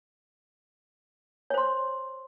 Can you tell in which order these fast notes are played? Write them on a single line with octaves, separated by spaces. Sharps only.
C#5 C5 C6